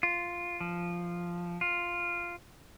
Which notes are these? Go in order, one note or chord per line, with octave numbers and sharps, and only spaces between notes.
F4
F3
F4